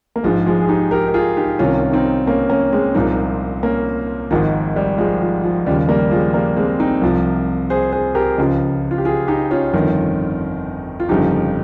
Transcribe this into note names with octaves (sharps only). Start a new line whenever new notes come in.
A#3
A#1 G#2 F3 G#3
F3 G#3
G#4
D#4 G4
G4 A#4
A#4
F4 G#4
D#4 G4
C2 C3 D#3 C#4 F4
C4 D#4
A#3 C#4
A#3 C#4
G#3 C4
C2 A#2 F3 C4 D#4
A#3 C#4
G#1 G#2 D#3 F3
G3
F3 G#3
F3
F3
D#2 C#3 F3 G3
G3 A#3
F3 G#3
G3 A#3
G#3 C4
C4 D#4
C2 C3 F3
G#4 C5
G#4 C5
G4 A#4
C#2 C#3 F3
F4
G4
F4 G#4
D#4 G4
C#4 F4
G1 F2 D#3
F4
G1 F2 C#3 F3 D#4 G4